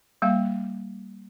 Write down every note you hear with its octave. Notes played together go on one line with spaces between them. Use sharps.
G3 A#3 F5